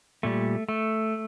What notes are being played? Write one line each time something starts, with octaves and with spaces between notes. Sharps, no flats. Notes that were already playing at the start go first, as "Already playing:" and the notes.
A#2 G3 A3
A3